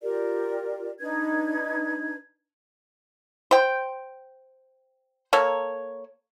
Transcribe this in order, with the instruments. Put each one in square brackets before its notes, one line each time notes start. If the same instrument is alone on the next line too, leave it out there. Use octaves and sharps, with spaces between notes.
[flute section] F4 G4 A#4 D5
D4 D#4 B4 G#6
[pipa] C5 G5
A#3 A4 C#5